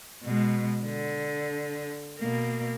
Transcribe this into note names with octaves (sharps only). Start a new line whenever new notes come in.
B2 G#3
D3
B2 A#3